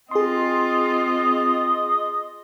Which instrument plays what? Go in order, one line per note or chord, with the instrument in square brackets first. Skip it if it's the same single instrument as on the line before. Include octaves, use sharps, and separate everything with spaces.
[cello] C4 F4 [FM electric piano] G#4 C6 [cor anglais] D#5